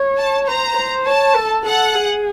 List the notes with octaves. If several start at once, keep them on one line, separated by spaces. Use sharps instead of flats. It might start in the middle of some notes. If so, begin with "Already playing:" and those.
Already playing: C#5
A5
C5 A#5
C5
C#5 A5
A4
A4 F#5
G#4